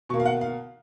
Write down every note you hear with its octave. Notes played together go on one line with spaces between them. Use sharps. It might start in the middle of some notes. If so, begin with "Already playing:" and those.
B2 A#3 C#6
F5
F#5
F5